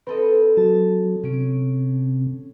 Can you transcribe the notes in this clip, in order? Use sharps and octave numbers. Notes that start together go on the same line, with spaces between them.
C4 A4 B4 D#5
F#3 A5
C3 C#4 D7